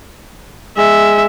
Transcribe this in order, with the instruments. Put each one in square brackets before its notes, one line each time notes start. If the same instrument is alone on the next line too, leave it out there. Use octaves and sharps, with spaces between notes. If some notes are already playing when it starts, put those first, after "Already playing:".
[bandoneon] G#3 [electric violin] E5